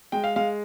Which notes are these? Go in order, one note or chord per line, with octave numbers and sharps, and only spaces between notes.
G#3 G5
F5
G#3 F5